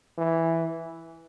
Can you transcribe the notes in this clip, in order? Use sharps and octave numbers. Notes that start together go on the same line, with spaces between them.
E3